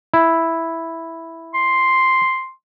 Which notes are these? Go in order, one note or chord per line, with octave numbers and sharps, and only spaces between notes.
E4
C6